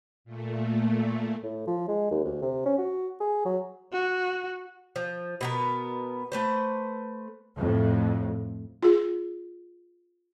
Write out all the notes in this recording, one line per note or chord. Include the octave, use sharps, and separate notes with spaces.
A#2 A3
A2
F3
G#3
D#2
D2
C3
C#4
F#4
G#4
F#3
F#4
F3
B2 B3 A#4
A3 B4 C5
F2 A2
F4 G#4